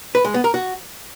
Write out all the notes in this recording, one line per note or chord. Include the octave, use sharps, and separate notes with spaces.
B4
G#3
B3
A#4
F#4